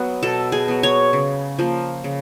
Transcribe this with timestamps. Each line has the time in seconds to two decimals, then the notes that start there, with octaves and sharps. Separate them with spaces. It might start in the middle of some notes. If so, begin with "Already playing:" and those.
Already playing: F#3 B3
0.23 B2 A4
0.52 G#4
0.68 F#3 B3
0.83 C#5
1.13 C#3
1.59 F3 A#3
2.04 C#3